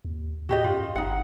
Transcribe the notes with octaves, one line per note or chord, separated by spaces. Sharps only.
D#2
A2 F#4 G4 D#5
F#2 F4
G1 D#4 F#5